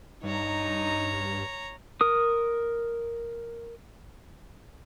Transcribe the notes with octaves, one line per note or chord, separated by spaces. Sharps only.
G2 D#4 C#5 A#5
A#4 D#6